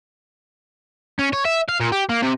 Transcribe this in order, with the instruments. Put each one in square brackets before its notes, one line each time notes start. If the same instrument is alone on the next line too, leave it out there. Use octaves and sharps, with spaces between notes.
[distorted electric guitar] C#4
C#5
E5
F5
A#2
G4
A#3
C3